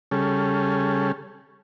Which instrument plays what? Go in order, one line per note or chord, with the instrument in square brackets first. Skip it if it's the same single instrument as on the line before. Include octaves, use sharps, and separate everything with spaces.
[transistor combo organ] C#3 G3 C#4 G#4 A4